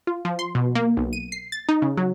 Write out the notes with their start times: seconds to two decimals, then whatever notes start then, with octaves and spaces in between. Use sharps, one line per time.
0.07 F4
0.25 F3
0.39 C6
0.55 B2
0.75 A#3
0.97 B1
1.13 D#7
1.32 C7
1.52 A6
1.69 D#4
1.82 C#3
1.97 F#3